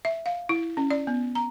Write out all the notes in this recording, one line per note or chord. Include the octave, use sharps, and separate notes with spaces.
E5
F5
E4
C#4
D5
B3
A#5